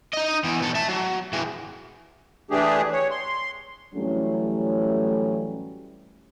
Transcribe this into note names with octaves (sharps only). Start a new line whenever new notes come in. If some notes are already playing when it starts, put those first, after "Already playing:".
D#4 D#5
E2 E3
B2 A4
E5 A5
F#3
E3 G#3
E3 A3 D4 G4 G#4
C#5
C6
A2 E3 F#3 G3 A3 C#4